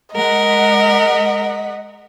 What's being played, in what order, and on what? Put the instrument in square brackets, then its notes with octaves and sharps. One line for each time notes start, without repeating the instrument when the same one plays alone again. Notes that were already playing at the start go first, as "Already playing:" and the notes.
[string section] G#3 F#5 B6 [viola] A#4 [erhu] D#5